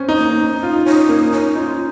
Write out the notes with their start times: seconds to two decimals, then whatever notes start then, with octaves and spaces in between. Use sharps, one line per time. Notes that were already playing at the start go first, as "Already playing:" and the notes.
Already playing: C4 C#4
0.09 D#4
0.16 A#3
0.40 D#4
0.63 F4
0.86 C#4 D#4
1.09 A#3
1.33 C#4 D#4
1.55 D#4 F4